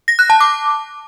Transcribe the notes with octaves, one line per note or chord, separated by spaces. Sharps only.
A#6
F#6
A5
D6